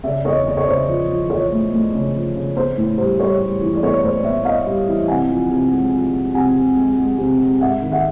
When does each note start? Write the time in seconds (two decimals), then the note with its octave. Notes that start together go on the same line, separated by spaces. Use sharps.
0.04 C#3 D5 E5
0.25 E2 C#5 D#5
0.47 C#3 D5
0.57 C#5
0.67 C#3 C5 D5
0.88 F3
1.10 F3
1.30 F3 C#5
1.52 A3
1.72 A3
1.94 C#3
2.14 F3
2.36 C#3
2.56 B3 C5
2.77 A2
2.98 G3 C5
3.20 G3 C#5
3.41 G3
3.61 E3
3.74 D5
3.83 B3 C#5
4.03 A2 C5 D5
4.24 B3 D5 E5
4.45 B3 D#5 F5
4.66 G3
4.87 E3
5.08 C3 F#5 G#5
5.30 F3
5.51 C3
5.72 G#3
5.93 F3
6.13 G#3
6.34 C3 F#5 G#5
6.56 C3
6.77 G#3
6.98 G#3
7.18 C3
7.40 G#3
7.61 G#2 E5 F#5
7.82 D#3
7.92 E5 F#5